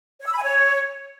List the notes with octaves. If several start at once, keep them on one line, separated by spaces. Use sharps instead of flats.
C#5
E6
B5
G#5
C#5